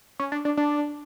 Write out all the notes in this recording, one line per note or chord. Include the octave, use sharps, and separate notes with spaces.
C#4
D4
D4
D4